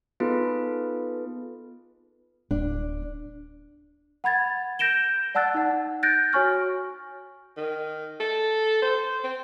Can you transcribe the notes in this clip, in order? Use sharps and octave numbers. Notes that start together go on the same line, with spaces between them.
B3 D#4 F4 G#4 A4 B4
D1 D4
F#5 B5 G#6 A6
G6 A#6 D7 E7 G7
D5 F#5 A5 E6 F#6 A6
D#4 F#5
F#6 G6 A6 A#6 D7
F#4 C#5 G#5 C#6 F6
D#3
A4
C5
C4